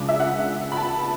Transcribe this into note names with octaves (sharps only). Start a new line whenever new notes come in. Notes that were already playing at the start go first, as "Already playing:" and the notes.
Already playing: C#2 C#3 G#3 D4
E5
F#5
B5
A5